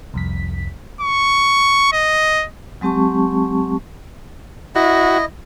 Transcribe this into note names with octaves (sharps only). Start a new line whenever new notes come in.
C2 F2 B6
C#6
D#5
F#3 G#3 C4 G4 A5 C#6
E4 F#4 D#5